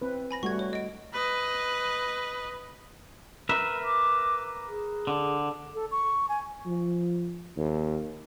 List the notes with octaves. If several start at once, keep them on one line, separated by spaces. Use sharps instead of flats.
C4 B4
G#5 B5 A#6
G3 A3 F#4 C#6 G#6
C#5
D#5 D7
B4 D#5
A#4 B4 E5
D6
G#4
D3
A4
C#6
G#5
F3
D#2